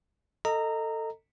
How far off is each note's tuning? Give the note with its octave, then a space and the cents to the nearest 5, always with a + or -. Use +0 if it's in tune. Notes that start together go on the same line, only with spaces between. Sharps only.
A4 +20 D#5 +0 A#5 -15